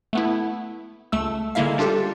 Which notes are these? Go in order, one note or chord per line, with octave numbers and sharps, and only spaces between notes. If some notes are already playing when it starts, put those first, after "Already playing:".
A3 B3 E4
C#2 A3 E6
D3 G#3 A#3 E4 E5 F5
G3 D4 F4 G4 A4